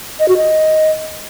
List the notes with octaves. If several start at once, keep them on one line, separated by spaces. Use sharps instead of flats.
D#5
F#4
D#5